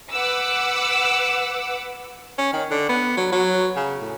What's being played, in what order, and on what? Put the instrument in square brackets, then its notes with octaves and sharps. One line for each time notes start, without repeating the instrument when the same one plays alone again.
[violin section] B4 F#5 D6 E6
[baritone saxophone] C#4
D#3
D3
B3
F#3
F#3
C#3
A2